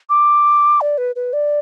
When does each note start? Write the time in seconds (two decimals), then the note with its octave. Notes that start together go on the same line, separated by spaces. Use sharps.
0.09 D6
0.81 D5
0.98 B4
1.16 B4
1.33 D5